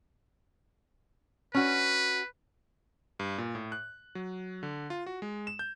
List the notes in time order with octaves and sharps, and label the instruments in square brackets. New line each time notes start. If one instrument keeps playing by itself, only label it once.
[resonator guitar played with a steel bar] C#4 F#4 [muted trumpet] B4
[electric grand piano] G2
A#2
A2
F#6
F#3
D3
F4
F#4
G#3
E7
G6